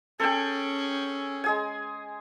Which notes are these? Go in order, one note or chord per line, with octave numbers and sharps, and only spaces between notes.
C#4 G#4 A4 G5
G#3 G#4 G#5